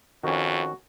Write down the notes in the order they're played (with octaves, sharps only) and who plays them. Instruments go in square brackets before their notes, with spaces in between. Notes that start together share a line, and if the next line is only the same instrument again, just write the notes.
[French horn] F2 [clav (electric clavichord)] D#3 C#4 [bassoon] F#4